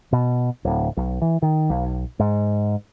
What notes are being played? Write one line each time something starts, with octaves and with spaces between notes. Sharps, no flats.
B2
D1
B1
E3
D#3
B1
G#2